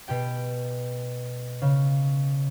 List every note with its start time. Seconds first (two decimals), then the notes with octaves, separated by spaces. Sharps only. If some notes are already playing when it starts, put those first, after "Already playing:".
0.07 B2 G4 G5 D7
1.62 C#3